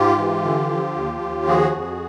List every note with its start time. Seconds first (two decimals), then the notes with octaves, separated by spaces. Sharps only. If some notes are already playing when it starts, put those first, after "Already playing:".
Already playing: G#2 F4 G4
0.18 E3
0.44 D3
0.70 F3
0.96 D#2
1.21 D#2
1.47 F3 F#4 G#4
1.73 F2